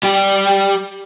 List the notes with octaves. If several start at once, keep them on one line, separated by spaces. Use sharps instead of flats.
G3 G4